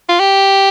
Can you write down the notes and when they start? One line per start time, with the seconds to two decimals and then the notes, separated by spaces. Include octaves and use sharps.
0.09 F4
0.20 G4